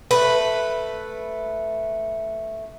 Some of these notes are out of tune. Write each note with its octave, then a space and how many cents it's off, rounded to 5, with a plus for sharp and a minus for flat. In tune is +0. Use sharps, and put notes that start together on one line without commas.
A3 +0 B4 +0